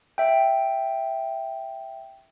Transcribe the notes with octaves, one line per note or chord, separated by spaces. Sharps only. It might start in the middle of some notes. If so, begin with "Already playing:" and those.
E5 G5